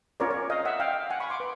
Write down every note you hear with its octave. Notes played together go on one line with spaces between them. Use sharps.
C#4 F4 A#4 C#5 D5
C#5
D#5 F5
E5 F#5
F5 G5
F#5 G#5
B5 C#6
C6 D6
B4